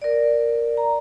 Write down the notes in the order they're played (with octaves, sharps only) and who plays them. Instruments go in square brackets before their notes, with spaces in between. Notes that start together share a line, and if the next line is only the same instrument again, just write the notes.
[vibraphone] A#4 D5
A#5